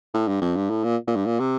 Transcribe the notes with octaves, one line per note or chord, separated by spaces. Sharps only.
A2
G2
F2
G2
A2
A#2
A#2
G2
A#2
C3